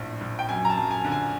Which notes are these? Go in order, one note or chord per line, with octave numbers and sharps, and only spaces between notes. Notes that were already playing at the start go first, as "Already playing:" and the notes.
Already playing: A#1 A2
A#1
G5
F#2 G#5
A#5
A5
F#2
G#5
D3
G#5